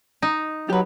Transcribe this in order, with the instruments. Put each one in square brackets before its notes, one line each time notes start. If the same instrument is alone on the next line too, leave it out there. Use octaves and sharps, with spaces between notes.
[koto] D#4
[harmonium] F#3 [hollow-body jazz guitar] G4 B4